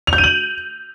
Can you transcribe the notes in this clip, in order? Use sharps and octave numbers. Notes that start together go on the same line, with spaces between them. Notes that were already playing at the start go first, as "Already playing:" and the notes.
F7
G6
D#7
F#7